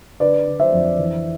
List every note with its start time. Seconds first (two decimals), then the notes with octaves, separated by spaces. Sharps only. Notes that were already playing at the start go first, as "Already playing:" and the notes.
0.20 D3 B4 D5
0.47 D3
0.60 C5 E5
0.72 F2
0.98 E3